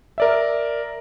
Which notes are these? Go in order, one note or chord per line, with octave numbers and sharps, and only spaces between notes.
A#4 D5 E5